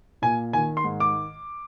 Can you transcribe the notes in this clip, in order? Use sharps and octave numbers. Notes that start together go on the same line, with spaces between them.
A#2 G#5
D#3 G#5
C6
G#2
D6